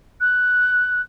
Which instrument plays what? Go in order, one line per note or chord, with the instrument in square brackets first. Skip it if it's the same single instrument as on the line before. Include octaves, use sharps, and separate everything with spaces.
[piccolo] F#6